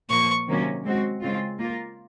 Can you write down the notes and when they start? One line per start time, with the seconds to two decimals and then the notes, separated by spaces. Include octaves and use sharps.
0.10 A#2 F3 A#3 C#6
0.48 C3 D#3 F#3 A#3 C#4
0.84 G#3 C4 F#4
1.22 C#3 G#3 C4 F4
1.59 A#3 F4 A#4